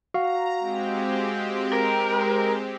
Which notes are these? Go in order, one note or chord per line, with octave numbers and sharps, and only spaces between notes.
F#4 F5 A#5
G#3 C4 G4
A#4